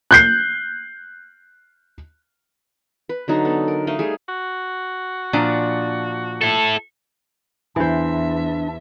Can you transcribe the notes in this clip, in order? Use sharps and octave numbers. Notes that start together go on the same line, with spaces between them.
F#6 G6 C7
B4
D3 F#3 D#4 A#5
B3 A4
A#4
A3 D#4 D#5 F5
G3 A3 G#4
F#4
A#2 F3 D4
E4 A4
E2 E3 D4 C5 E5